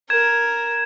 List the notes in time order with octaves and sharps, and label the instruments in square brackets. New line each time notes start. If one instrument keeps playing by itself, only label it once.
[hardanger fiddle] A#4 [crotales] G#6 E7